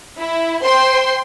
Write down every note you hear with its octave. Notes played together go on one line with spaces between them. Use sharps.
E4
C5 G5 C6